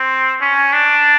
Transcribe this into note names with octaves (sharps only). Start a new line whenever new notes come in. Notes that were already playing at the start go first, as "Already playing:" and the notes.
Already playing: C4
C#4
D4